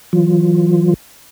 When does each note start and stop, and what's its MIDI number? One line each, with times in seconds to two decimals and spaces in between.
0.13 0.94 52
0.13 0.94 54
0.13 0.94 65